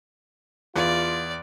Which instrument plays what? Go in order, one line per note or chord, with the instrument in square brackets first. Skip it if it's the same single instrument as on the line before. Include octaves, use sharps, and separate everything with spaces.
[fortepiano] E2 [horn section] F4 [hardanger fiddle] D5